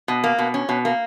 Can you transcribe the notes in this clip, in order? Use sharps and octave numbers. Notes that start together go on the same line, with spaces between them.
B2
A#3
B2
C#4
B2
A#3